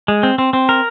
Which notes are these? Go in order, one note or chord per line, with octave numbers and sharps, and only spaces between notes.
G#3
C4
C4
C4
A#4